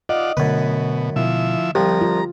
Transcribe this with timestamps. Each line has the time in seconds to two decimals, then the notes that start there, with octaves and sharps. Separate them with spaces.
0.09 F4 D5 D#5 F#5
0.37 F#2 B2 D3 A3 B4
1.16 B2 F3 E4 E5
1.75 C2 F3 G4 A#5
2.01 F4